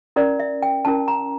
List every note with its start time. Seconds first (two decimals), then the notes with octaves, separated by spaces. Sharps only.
0.16 C#4 E4 A#4 D5
0.40 E5
0.62 G5
0.85 C#4 E4 A#4 A5
1.08 A#5